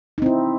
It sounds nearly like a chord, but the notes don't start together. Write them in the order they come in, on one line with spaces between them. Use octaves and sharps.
D#4 C4 E4